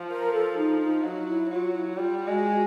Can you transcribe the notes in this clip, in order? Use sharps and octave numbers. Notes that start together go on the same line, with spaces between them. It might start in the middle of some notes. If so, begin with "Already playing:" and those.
Already playing: F3
A#4
A4
D#4
D#4
F#3 D#4
E4
F#3 F4
E4
G3 F4
G#3 F#4